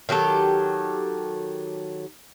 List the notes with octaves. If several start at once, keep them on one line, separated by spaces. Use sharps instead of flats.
D#3 F#3 G4 A4